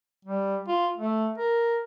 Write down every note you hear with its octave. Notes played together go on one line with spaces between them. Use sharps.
G3
F4
A3
A#4